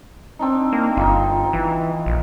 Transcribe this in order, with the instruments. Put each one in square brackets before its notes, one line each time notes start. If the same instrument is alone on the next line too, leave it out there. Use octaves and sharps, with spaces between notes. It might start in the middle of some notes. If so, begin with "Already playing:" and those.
[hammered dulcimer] C4 D4 D#4
[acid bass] A#3
[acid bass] G1 [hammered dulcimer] D#4 F4
[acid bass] E3
A#1